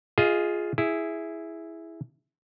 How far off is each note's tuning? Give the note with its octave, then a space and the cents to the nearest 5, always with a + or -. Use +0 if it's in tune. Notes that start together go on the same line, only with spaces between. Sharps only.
F4 +0 G#4 +0 D#5 +30
E4 +0 G#4 +0